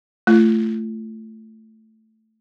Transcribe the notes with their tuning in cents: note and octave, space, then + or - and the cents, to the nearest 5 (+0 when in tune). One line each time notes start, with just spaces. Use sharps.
A3 +0 F4 -30